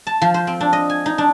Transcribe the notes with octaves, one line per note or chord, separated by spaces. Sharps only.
A5
F3
C5
C4
D4
D#5
G#5
D#4
D4